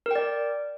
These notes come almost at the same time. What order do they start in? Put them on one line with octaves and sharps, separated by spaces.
A#4 G5 D5